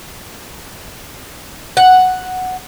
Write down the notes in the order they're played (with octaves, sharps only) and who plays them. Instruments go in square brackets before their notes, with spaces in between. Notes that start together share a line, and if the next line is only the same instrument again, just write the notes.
[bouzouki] F#5